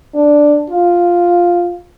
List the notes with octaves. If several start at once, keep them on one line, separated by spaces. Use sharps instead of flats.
D4
F4